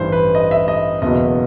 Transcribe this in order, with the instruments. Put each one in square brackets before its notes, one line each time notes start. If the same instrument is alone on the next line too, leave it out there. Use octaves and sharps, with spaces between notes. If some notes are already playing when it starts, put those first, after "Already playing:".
Already playing: [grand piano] A1 G2 E3 G3 C5
B4
D#5
E5
D#5
F#1 E2 B2 D#5